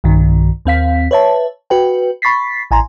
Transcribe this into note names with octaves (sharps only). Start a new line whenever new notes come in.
B1 G2 D#3
D#2 C4 F5 B6
B4 C#5 E5 A5
F#4 B4 G5
B5 C#6 A6 B6 C7
A1 G#5 A#5 C6